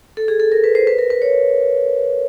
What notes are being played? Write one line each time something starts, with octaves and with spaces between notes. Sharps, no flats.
A4
G#4
A4
A#4
B4
C5
B4
A#4
B4
C#5